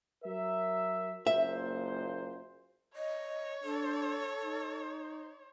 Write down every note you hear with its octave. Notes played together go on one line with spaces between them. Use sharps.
F#3 A#4 E5
F#1 A#2 C5 E5
C#5 D#5
D4 A4
D#4